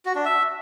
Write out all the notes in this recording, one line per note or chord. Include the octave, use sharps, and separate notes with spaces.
F#4
D4
E5